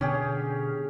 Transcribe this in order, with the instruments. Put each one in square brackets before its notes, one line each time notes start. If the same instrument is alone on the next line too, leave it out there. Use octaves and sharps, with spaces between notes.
[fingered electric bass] B2 D3 [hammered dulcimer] C#4 G4 G#4